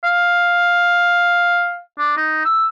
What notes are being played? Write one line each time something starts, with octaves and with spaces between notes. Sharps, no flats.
F5
D4
D#4
E6